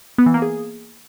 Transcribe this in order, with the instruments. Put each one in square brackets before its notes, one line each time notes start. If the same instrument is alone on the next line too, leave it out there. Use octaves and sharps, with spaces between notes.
[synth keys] B3
E3
A#3
G#4